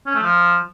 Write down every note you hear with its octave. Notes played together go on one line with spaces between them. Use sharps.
C#4
A3
F3